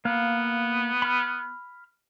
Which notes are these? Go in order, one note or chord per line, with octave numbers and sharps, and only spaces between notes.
A#3 B3 F5
B5 F6